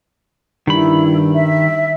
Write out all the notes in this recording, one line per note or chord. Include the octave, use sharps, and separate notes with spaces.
G2 D#3 E4 B5
E5